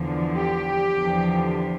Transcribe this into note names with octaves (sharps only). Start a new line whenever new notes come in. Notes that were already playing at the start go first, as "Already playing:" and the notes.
Already playing: E2 D3 F3
G4
E2 D3 F3